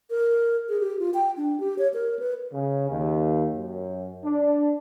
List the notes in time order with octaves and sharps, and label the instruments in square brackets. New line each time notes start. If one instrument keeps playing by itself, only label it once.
[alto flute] A#4
G#4
G4
F4
G5
D4
G4
C#5
A#4
B4
[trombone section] C#3
D#2
F#2
D4